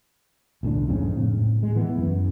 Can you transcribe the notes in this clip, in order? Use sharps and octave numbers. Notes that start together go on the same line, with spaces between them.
C2 A2 D3 D4
F2 G#2 C#3 C4
A2
G#3
E3 B3
F#2